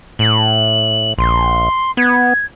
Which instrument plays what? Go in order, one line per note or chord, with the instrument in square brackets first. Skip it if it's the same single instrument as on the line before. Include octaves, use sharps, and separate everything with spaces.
[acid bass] A2 [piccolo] F#7
[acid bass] A#1 [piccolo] C6
[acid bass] B3 [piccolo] G#6